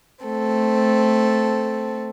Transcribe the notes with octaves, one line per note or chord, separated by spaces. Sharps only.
A3 C4 A4